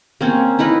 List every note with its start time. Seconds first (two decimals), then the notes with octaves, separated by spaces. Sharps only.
0.21 A#3 C4 C#4
0.59 D#4 E4 A#4 B4